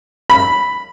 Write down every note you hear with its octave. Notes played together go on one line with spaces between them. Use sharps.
B5